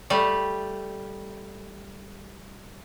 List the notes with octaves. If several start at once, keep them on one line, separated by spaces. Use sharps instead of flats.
G3 A3